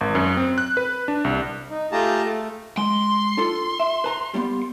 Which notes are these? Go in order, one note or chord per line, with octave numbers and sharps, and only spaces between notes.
G#1
F#2
C4
F#6
B4
D4
C2
D#4
A3 F4 G4 G#4 A5 A#5
A3
G#3 C6
D4 F4 A4
E5
B4 A5 A#5
G3 A#3 B3